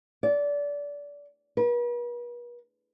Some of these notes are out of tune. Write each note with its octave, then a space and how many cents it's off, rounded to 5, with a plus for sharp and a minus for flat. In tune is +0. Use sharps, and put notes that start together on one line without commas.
D5 -25
B4 -45